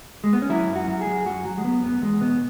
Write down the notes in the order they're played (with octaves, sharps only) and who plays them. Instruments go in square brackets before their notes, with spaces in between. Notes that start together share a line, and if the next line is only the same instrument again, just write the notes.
[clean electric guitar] G#3
B3
C#4
F#3 E4
F#2
F#4
F#3
G#4
F#3
F#2 F#4
F#3
G#3
F#3 B3
F#2 B3
E2 G#3
B2 B3